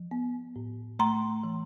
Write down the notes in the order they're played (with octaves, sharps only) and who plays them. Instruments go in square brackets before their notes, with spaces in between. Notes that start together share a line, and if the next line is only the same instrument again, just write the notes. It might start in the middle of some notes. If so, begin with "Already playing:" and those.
Already playing: [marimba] F3
B3
A2
A3 A#5 C6
E3